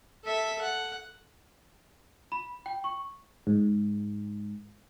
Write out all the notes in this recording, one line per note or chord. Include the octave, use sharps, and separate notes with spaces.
A4 E5
F#5
B5
G5
C#6
G#2